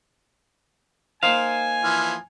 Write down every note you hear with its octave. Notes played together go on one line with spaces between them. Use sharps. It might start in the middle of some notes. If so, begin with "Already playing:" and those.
A#3 D#4 C5 F5 G#5
E3 F3 F6